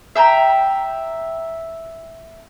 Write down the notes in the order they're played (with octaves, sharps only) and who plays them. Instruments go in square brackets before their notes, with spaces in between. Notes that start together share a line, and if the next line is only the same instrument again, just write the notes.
[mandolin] E5 G5 G#5 A#5